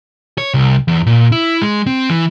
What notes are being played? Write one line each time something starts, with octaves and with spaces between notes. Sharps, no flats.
C#5
C2
E2
A#2
E4
G#3
C4
E3